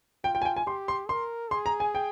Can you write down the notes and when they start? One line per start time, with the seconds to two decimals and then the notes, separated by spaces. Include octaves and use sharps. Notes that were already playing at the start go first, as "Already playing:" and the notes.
0.24 F4 G5
0.35 G5
0.42 G#5
0.45 G5
0.56 G#5
0.67 G4 C6
0.88 C6
1.09 A#4 C6
1.51 G#4 C6
1.66 A#5
1.80 G#5
1.95 G5